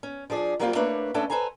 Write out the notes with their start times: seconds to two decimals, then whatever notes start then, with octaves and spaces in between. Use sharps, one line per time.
0.03 C#4
0.30 F3 D4 G#4 D5
0.60 F#3 G3 A#3 C4 D#4 F4
0.75 A3 A#3 D4 B4 C#5
1.14 A3 B3 C#4 D4 A4
1.30 A4 B4 C5 G#5 A#5